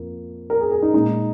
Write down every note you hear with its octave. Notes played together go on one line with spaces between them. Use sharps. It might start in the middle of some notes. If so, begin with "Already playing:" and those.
Already playing: F2 F3 A#3
A#4
G#4
G#4
D#4
A#2 G#3 D#4